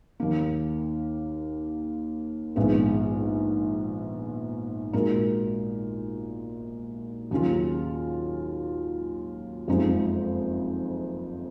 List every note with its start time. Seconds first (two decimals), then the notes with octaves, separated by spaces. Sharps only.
0.20 D#2 D#3 A#3
2.56 A#1 G#2 D#3 G#3 B3
4.93 A#2 G#3 D#4 F#4 A#4
7.31 D#2 C#3 F#3 C#4 F4
9.68 F#1 F2 F3 G#3 D#4